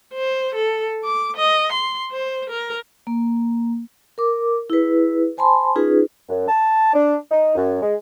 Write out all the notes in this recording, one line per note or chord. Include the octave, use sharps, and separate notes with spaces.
C5
A4
D6
D#5
C6
C5
A#4
A#3
A#4 D6
E4 G#4 B4
C5 G#5 A5 B5 C6
C#4 D#4 F4 G#4 B4
F#2
A5
D4
D#4
F#2
G#3